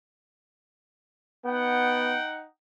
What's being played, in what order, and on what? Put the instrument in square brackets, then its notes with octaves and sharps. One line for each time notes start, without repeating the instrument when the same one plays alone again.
[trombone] B3 [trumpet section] D#4 F#5 G5